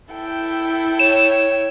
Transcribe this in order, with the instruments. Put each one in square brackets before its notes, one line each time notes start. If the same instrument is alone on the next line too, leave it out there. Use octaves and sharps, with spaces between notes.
[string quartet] E4 A4 G5
[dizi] C#5 [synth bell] E7